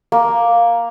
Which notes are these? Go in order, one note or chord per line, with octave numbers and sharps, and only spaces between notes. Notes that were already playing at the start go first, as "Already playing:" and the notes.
A#3